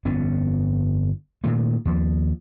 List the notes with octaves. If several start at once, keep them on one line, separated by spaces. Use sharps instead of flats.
G1 F2 B3 C#4
A#2 D#3 A3
D#2 F3